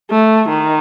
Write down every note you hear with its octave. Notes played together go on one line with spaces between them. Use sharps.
A3
D#3